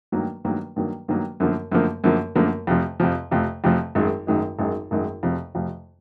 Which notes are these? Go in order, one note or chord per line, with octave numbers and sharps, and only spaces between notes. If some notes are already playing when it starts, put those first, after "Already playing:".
G2 D#3 F#3 A#3
G2 D#3 F#3 A#3
G2 D#3 F#3 A#3
G2 D#3 F#3 A#3
F#2 D3 F3 A#3
F#2 D3 F3 A#3
F#2 D3 F3 A#3
F#2 D3 F3 A#3
F2 C3 F3
F2 C3 F3
F2 C3 F3
F2 C3 F3
G#1 F#2 D#3 G#3
G#1 F#2 D#3 G#3
G#1 F#2 D#3 G#3
G#1 F#2 D#3 G#3
F2 C3 F3
F2 C3 F3